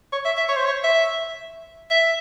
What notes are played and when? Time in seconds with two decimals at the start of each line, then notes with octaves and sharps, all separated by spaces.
0.13 C#5
0.25 E5
0.37 E5
0.49 C#5
0.57 C5
0.65 C#5
0.84 E5
1.91 E5